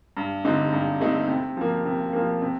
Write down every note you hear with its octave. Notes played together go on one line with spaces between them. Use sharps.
G2
D3 A3 C4 D#4
G2
D3 A3 C4 D#4
C3
F3 A#3
C3
F3 A#3
C3